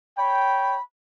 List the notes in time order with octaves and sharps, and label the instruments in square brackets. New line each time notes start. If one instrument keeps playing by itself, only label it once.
[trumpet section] C#5 G5 [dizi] B5